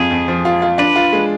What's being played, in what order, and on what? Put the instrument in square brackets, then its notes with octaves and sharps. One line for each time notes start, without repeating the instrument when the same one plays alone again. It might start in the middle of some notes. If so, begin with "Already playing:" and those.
Already playing: [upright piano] F2 F4 [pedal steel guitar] G#4
[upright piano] F2
F3
F4
F4
[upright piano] D4 [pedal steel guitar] B4
[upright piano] F4
G#3